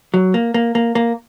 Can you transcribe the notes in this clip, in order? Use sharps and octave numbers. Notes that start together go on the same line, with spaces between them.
F#3
A#3
A#3
A#3
A#3